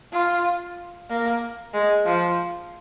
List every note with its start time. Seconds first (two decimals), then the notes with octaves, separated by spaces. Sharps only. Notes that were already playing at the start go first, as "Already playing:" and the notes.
0.12 F4
1.09 A#3
1.74 G#3
2.05 F3